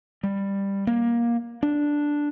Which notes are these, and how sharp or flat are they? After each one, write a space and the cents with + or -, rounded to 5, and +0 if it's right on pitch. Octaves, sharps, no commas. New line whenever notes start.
G3 +10
A#3 +15
D4 +0